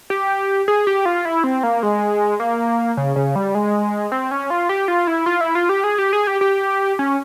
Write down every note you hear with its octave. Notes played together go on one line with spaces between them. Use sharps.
G4
G#4
G4
F4
E4
C4
A#3
G#3
A#3
C#3
C#3
G3
G#3
C4
C#4
F4
G4
F4
E4
F4
E4
F4
G4
G#4
G4
G#4
G4
G4
C#4